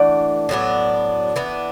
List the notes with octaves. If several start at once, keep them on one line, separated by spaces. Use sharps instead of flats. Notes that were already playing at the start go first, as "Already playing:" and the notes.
Already playing: E3 A3 D4 D5 F#5
A2 F#3 B3 D4
E3 B3 D4